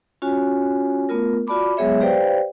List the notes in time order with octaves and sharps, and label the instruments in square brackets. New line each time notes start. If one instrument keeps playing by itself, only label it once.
[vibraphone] C#4 F4 F#4 C#5 G#5
A3 B3 F4 A#4
F4 F#4 D5 A5 B5 D6
F#3 G#3 B3 G#4 C#5 E5
G4 B4 C5 D5 F5 G5